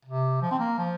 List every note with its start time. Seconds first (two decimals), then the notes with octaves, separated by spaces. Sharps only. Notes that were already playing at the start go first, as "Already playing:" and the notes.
0.05 C3
0.42 F3
0.51 C4
0.59 A#3
0.78 F3